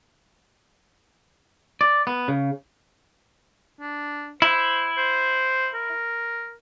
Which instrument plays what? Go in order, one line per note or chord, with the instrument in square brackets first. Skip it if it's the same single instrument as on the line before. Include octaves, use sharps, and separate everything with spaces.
[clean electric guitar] D5
B3
C#3
[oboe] D4
[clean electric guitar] E4 [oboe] C5
[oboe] C5
A#4